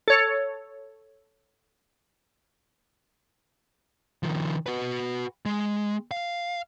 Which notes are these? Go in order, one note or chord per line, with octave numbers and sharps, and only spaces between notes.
A4 C#5
D#3 F3
F#4 B4
G#3
F5